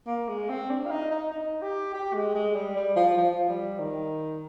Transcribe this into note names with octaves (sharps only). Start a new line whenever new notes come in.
A#3
G#3
C4
D4
F4
D#4
D#4
D#4
G4
G4
G#3
G#3
G3
G3
F3
F3
G3
D#3